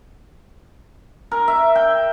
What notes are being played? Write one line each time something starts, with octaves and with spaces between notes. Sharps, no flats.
A#4
E5
G5